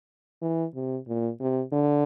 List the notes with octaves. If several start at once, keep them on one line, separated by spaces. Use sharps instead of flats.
E3
C3
A#2
C3
D3